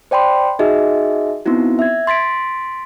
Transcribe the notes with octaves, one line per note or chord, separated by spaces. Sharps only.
C5 D5 G5 B5 C6
D#4 F#4 G#4 D#5 E5
B3 C4 D#4 E4 F#4
E5 G#6
C6 A6 B6 D7